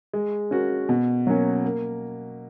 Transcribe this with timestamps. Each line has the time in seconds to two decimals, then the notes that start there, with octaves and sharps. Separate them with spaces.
0.13 G#3
0.51 C#4 F#4 A#4
0.89 B2
1.27 F#3 A#3 C#4
1.64 A#3